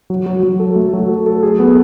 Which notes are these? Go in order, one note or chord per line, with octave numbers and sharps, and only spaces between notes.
F#3
F#3
F#3
A4
A3
F#3
A4
A4
G#4
B3